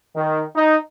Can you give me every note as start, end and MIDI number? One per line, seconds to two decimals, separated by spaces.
0.14 0.43 51
0.55 0.76 63